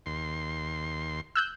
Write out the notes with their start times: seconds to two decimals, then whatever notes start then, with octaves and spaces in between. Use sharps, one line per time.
0.06 D#2 C6
1.35 E6 F#6 G6